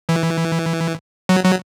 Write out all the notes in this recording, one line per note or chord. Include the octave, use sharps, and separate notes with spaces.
E3
F#3
F#3